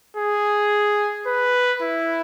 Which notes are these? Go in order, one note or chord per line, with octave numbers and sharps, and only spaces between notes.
G#4
B4
E4